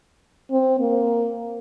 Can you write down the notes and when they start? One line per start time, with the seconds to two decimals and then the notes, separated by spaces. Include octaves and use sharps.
0.51 C4
0.79 A#3